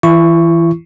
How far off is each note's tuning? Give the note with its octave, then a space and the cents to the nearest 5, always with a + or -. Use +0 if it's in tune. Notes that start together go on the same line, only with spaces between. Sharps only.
E3 -5 E4 +35 C#6 +0